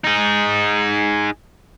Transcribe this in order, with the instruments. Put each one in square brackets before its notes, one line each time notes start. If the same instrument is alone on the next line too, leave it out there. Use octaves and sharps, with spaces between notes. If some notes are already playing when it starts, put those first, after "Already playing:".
[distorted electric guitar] D#4 G#4